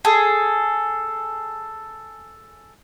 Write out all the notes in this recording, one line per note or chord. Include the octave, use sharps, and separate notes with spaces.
G#4 A4